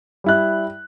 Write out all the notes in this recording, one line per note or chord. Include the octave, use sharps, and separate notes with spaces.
G3 E4 F#6